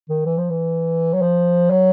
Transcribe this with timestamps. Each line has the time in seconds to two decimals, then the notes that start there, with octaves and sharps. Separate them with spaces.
0.09 D#3
0.26 E3
0.38 F3
0.50 E3
1.14 F#3
1.22 F3
1.70 F#3